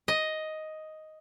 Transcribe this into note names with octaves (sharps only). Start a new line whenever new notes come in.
D#5